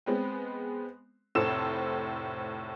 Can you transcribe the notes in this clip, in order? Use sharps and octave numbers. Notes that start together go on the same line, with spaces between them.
G#3 B3 C4
F1 A2 A4 C5 E6 E7